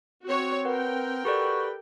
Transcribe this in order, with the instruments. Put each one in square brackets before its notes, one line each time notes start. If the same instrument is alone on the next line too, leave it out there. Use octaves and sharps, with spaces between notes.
[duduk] C4 [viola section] F#4 C#5
[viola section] A#4 G5 [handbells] B4 F#5
[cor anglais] F#4 [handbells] G4 A4 D5 [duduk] B4